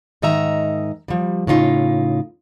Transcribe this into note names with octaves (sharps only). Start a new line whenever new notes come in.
G#2 D#3 D#5 E5 A#5
F3 G3
A2 C#3 D#4 F4